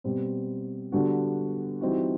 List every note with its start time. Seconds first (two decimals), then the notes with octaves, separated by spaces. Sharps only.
0.04 B2 G3 C4
0.92 D3 G3 B3 D4 F#4
1.81 E3 G3 C4 D#4 F#4